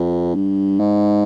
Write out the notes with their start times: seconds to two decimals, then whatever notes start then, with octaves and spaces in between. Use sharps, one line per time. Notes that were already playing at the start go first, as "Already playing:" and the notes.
Already playing: F2
0.35 G2
0.79 G#2